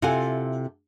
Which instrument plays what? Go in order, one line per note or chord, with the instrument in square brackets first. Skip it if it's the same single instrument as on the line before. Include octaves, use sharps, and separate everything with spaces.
[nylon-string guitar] C3 E4 F4 A4 F#5 G#5